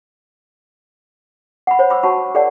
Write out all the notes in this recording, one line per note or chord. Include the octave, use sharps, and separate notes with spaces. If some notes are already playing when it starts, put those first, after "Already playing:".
F#5 B5
C5 C#5
B5 D6 E6
F#4 C#5 F#5 A5 B5 C#6
G#4 A#4 C#5 D5 F#5 A5